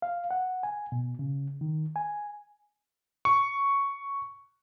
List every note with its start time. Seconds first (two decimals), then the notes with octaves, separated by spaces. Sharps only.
0.02 F5
0.31 F#5
0.63 G#5
0.92 B2
1.19 C#3
1.61 D#3
1.96 G#5
3.25 C#6